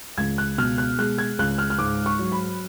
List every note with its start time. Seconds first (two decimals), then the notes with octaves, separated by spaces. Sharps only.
0.17 C#2 G#6
0.38 F#6
0.58 B2 F6
0.78 F#6
0.98 G#3 F#6
1.18 G#6
1.39 C#2 F#6
1.58 F6
1.70 F6
1.79 G#2 D6
2.06 C#6
2.19 F#3
2.32 B5